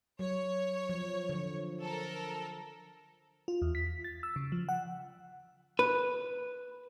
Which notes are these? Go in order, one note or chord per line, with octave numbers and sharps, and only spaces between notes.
F#3 C#5
F3
D3 F3
A4 A#4
F4
E2
B6
A6
E6
C#3
F3
F#5
B4